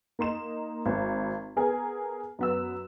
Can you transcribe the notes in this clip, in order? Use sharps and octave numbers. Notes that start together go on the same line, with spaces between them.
A#3 D#4 C6 E7
G#1
B3 G#4 A#4 G#5
F#2 B3 E6